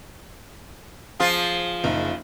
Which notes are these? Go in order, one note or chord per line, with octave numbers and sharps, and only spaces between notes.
F3 F4 G#4
F#1 D#4